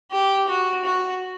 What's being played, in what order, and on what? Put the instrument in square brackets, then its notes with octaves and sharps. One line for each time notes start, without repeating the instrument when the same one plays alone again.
[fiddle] G4
F#4
F#4